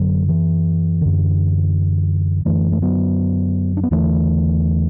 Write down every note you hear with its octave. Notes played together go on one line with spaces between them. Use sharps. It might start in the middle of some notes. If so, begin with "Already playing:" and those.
Already playing: F#2 D3 F#3
E3
F#2 D3
F#2 D3 E3 A3
A3
F#3 B3
D4
B3
E2 D3 E3 A3